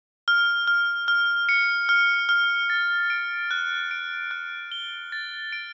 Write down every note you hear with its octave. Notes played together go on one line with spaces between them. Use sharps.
F6
F6
F6
C#7
F6
F6
A6
D7
F#6
D7
F#6
G7
A6
D7